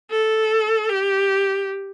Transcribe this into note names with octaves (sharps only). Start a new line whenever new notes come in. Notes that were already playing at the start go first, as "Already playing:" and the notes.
A4
G4